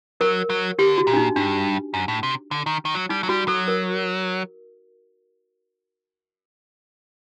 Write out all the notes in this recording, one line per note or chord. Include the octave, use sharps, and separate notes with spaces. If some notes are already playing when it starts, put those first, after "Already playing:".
F#3 A#4
F#3
D3 G4
F#4
A#2
D4
D#4
G2 D4
F#2
A2
C3
D3
D#3
D#3
F#3
G3 D#4
F#3
G3 F#4
F#3 A4
A#4